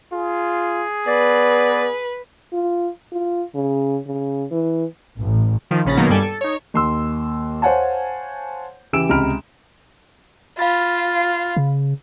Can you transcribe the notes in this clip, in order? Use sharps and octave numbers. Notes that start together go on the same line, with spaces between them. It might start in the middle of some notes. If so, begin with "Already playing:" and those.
F4 G#4
B3 B4 D5
F4
F4
C#3
C#3
E3
A1
D#3 F3
A#1 C#3 C#4 B5 A6 A#6
B2 D#3 F#3 A#3 B3
G2 G3 A4 G#5 D6
A4
D#4 C#5
D#2 C6 E6
C5 C#5 F5 F#5 G#5 A5
C#3 E3 G4 E6 D7 E7
C#2 C3 A#5 B5 F6 D7
F4 F5 B5 A6
C#3